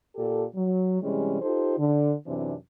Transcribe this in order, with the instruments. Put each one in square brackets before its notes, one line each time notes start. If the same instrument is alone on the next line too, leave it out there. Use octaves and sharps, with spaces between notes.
[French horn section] A#2 G4 A4
F#3
C3 E3 G3 G#3 C#4
D#4 F4 G4 A4 C5
D3
F#2 C3 E3 C4 D4